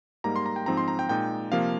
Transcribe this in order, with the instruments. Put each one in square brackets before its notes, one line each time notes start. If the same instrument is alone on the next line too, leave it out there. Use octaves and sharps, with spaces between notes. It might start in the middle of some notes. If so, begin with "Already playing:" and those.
[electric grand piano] G#2 G3 A#3 D#4 A#5
C6
A#5
G5
G#2 F3 C4 D#4 A#5
C6
A#5
G5
A#2 G#3 D#4 G5
C3 F3 A#3 F5